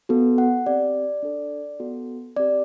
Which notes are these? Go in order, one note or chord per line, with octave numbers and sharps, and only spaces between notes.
B3 F#4 A4
F#5
C4 G4 D5
D4 A4
B3 F#4 A4
C4 G4 D5